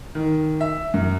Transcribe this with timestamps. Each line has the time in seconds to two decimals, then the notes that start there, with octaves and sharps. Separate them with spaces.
0.15 D#3
0.61 E5
0.94 F#2